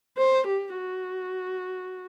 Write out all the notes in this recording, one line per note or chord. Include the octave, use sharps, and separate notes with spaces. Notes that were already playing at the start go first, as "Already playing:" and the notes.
C5
G4
F#4